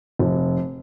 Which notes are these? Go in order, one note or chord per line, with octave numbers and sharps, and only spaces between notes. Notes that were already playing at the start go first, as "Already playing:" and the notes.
F1